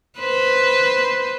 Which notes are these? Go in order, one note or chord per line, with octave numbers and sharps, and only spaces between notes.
B4 C5